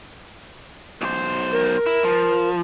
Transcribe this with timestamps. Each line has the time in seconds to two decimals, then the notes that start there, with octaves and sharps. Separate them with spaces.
1.02 B1 C5
1.52 A#4
1.86 E4
2.04 F3